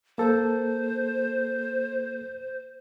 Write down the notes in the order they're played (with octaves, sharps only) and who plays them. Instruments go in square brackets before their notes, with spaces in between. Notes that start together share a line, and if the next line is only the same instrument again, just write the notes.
[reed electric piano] A#3 A4 [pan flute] C5